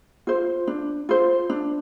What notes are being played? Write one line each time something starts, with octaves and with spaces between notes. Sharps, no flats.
F4 C5
D4
F4 C5
D4